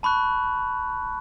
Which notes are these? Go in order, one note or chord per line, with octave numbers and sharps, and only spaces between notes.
A5 B5 C#6 F#6